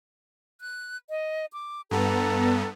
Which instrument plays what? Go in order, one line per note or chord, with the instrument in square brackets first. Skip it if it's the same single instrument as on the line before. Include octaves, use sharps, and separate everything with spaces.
[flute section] F#6
D#5
D6
[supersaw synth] G2 B3 [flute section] A4 A#5